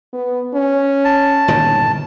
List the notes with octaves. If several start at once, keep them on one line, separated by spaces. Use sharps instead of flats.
B3
C#4
A5
G1 A#2 D#3